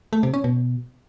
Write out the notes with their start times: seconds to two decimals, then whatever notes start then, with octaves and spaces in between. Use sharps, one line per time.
0.13 A3
0.23 C3
0.34 C#4
0.44 B2